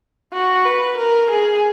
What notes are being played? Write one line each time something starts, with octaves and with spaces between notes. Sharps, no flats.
F#4
B4
A#4
G#4